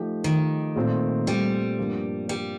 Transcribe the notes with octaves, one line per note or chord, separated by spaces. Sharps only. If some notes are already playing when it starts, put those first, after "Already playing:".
Already playing: F3 A3 D#4 G4
D#3
A#2 A3 C4 F4
G3
G2 F3 A#3 D4
G3